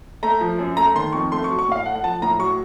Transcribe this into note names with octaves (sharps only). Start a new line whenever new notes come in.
A3 A#5
F3
F#2
A3 A#5
D#3 C6
F2 C#6
A3 C6
C#6
F#3
C#6
A2 F5
A3 F#5
F#5
F3 A5
A2 A#5
F#3 C#6